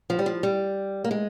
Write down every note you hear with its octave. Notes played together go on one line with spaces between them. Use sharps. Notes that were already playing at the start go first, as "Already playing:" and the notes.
F3
G3
F3
G3
A#3
G#3